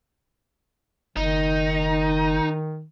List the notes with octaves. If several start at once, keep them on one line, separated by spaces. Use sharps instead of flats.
F#1 D#3 D#4